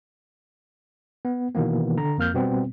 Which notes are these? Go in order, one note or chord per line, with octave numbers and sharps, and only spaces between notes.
B3
B2 D#3 E3 A#3 B3
D3 A#5
F2 A#3 F6 G6
B2 G3 B3 C4